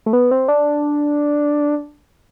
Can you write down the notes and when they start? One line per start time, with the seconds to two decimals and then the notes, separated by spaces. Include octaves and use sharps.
0.06 A3
0.13 B3
0.31 C4
0.48 D4